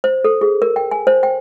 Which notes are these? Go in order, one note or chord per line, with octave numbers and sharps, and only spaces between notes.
C5
A4
G#4
A#4
G5
G#5
C5
G5